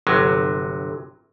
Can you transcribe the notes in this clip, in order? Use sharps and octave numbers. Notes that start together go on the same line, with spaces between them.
G1 C3 F#3